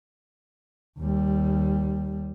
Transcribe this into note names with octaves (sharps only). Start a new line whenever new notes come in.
D#2 G3